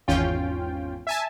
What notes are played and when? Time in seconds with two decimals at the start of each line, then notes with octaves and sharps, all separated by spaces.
0.08 G#1 E2 C#4 F4 G5
1.07 E5 G#5 A5